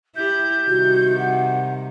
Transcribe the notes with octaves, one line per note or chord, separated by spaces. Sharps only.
E4 G4 G6
C3 D#3 G3 F#4
F#5